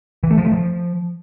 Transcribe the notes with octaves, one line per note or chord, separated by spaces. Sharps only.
E3
A3
F3
A3
F3